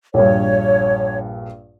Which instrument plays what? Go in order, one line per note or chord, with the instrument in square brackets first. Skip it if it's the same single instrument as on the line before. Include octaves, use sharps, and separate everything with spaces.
[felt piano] A#1 G2 [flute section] C#5